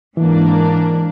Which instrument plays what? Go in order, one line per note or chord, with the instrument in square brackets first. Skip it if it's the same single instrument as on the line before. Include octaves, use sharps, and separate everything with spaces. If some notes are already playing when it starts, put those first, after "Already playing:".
[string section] G#2 A#3 D4 [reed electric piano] E3